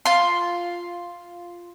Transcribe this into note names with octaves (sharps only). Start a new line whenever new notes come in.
F4 C6